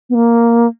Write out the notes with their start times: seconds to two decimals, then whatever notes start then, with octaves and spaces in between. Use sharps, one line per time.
0.10 B3
0.15 A#3